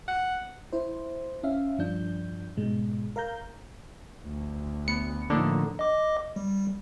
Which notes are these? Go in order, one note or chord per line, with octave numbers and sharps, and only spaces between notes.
F#5
E4 C5
C#4 E5 F5
G2 F3 D4 G6
G#2 B2 G#3
A#4 F5 A#5 G6
D2
B3 C#7
A2 D3 F3 A#3 D4 D#4
D#5 D6
G3